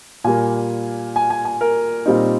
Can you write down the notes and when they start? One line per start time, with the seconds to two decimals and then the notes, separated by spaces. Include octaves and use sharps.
0.24 A#2 G3 A#3 G#5
1.16 G#5
1.30 G#5
1.45 G#5
1.61 A#4
2.06 A#2 G3 C4 D#4